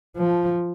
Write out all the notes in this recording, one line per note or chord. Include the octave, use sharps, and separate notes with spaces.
F3